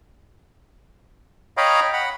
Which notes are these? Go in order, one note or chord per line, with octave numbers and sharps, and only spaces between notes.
C#5 D#5 F5 G5 A#5 B5
F#5 B5